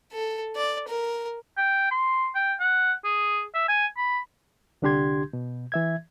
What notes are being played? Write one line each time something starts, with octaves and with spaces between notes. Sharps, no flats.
A4
D5
A#4
G5
C6
G5
F#5
G#4
E5
G#5
B5
C2 D3 D4 G4 C6 G#6
B2
E3 E5 G#6